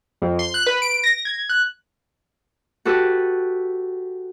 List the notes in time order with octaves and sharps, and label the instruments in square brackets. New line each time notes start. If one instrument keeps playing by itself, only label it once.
[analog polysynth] F2
C6
F#6
B4
D7
A#6
G#6
F#6
[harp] F#4 G4 A4 B4